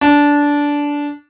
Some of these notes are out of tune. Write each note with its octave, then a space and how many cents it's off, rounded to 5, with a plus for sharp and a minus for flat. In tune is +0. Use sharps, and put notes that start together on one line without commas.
D4 -15